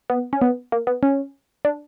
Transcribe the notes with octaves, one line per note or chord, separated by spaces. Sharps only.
B3
C#4
B3
A#3
B3
C#4
D4